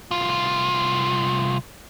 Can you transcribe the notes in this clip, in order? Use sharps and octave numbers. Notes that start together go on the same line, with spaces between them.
C2 F4